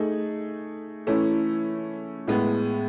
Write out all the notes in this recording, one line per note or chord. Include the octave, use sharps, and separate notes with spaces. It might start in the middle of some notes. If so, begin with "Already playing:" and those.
Already playing: A3 D#4 G#4
E3 A3 C#4 E4
A2 G#3 B3